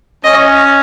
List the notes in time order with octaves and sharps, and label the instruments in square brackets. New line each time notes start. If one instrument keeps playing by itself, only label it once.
[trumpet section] C#4 [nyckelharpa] D#5